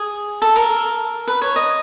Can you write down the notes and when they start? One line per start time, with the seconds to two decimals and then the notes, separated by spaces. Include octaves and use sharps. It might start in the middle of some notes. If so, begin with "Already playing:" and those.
Already playing: G#4
0.42 A4
0.56 A#4
1.27 B4
1.41 C#5
1.56 D#5